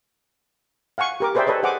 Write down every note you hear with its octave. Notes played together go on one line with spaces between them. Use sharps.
F5 F#5 G#5 C#6
G4 A#4 D6
G#4 B4 C5 D5 E5 G5
G4 A4 B4 C#5 D#5
G#4 C5 F#5 G#5 D6